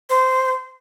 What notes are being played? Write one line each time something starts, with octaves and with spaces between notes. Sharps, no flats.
C5